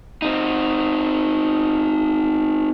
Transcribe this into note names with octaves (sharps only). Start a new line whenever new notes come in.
C4 D#4